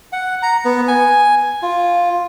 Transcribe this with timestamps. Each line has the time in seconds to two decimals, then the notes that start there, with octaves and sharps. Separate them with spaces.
0.13 F#5
0.42 A#5
0.65 B3
0.88 G#5
1.62 F4